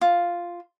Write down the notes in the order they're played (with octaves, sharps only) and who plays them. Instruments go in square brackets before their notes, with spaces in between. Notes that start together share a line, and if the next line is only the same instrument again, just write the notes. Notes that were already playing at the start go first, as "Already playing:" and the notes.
[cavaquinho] F4